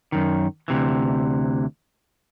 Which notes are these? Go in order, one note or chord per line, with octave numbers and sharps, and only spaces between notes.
F#2 D#3
D2 C3 E3